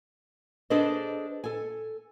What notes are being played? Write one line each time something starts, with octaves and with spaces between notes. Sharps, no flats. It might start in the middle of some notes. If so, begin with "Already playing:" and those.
D4 G#4 A4 B4 C5 D#5
A4 G#5